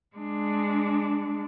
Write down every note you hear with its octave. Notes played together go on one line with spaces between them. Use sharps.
G#3 D4